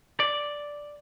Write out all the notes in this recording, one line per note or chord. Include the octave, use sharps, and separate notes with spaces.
D5